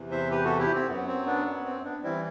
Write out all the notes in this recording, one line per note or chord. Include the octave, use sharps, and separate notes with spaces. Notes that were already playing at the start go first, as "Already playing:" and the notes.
Already playing: E2 C3 E3
C5 E5
G4 B4
F#4 A4
E4 G4
C4
F#2 F#3 B3
C4
B3 D4
B3
C4
B3 D4
E3 G3 C4 E4